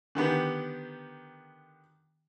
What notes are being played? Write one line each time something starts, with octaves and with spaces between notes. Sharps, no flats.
D3 D#3 B3 G4